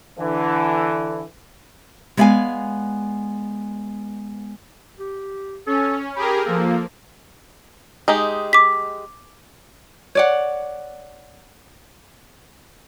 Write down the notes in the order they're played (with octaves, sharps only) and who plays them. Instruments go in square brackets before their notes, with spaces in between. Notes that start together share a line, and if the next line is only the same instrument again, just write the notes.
[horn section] D3 E3
[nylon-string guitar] G#3 B3 D5 D#5 F5 G#5
[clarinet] G4
[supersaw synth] C#4 [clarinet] A4
[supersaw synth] G4 G#4 A#4 [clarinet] B5
[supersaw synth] F3 A#3 [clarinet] A4
[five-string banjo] G#3 D#4 G4
[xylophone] D6 B6
[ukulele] C#5 D5 F#5